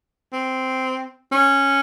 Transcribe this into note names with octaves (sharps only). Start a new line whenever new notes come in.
C4
C#4